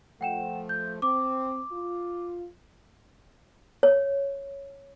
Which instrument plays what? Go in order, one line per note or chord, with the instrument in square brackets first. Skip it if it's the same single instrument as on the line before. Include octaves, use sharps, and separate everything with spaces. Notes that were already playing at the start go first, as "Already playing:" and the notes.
[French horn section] F3 A3 [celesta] F#5 G5 E7
[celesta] G6
[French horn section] C4 [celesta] D6
[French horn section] F4
[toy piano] C#5